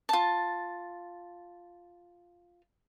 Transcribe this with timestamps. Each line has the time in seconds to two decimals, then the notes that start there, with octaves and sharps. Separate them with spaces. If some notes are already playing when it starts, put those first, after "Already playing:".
0.09 F4 A5